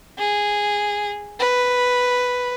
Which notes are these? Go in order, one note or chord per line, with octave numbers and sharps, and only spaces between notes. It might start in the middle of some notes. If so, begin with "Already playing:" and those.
G#4
B4